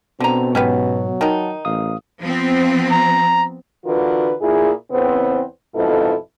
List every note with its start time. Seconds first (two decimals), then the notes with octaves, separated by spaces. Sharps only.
0.20 B2 D3 C4 A#5
0.55 G#2 F#3 B3 C#4 G4 B4
1.21 D#3 D#4 F#5 A5
1.65 A1 F5 D#6
2.21 F3 B3 C4
2.91 A#5
3.84 D3 E3 F4 F#4 A#4 B4
4.40 A#2 E4 F4 G#4
4.90 E2 C#3 B3 C4
5.74 F2 G#2 B2 E4 F4 A4